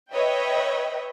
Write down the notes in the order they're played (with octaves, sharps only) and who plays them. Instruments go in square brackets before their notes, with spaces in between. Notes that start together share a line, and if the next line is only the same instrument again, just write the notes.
[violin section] B4 C#5 D#5 E5 G5